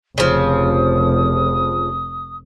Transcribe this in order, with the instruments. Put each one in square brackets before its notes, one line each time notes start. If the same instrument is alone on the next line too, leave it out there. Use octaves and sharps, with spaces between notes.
[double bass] F1 [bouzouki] C#3 F3 [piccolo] D#6